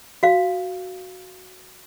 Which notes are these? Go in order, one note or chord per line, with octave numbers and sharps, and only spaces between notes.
F#4 F5